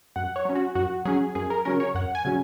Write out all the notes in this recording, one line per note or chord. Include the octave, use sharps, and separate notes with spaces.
F#2 F#5
C#5
F#3 C#4
F#4
F#2 F#4
F#3 C#4 G#4
F#2 G#4
A#4
C#3 F#3 C#4 A#4
C#5
F#2 F#5
G#5
C#3 F#3 C#4